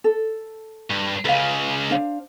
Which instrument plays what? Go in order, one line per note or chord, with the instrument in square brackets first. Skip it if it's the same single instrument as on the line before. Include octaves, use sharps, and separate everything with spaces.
[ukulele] A4
[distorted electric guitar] G2
[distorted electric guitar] C#2 C#3 [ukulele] B4 E5 F5
[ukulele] D4 C5 F5